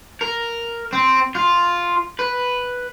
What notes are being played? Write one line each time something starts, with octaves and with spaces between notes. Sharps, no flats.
A#4
C4
F4
B4